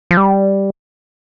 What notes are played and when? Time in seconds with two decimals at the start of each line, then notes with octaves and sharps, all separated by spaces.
0.11 F3
0.17 G3